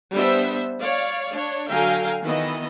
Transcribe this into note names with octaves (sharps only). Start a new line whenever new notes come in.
G3 B3 D4 C5 E5
C#5 D5 F5
D4 C#5
D3 F#3 F5 G5 G#5 A#5
D#3 E3 B3 D#5